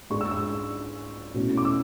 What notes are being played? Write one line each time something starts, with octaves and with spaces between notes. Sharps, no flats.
G#2 G#3 D4 C#6
E6
E6
B2 A3 C#4 E4
D6
E6